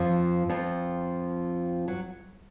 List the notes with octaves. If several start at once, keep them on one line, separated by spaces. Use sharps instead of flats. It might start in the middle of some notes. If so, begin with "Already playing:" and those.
Already playing: F2 F3
F2 F3
F#3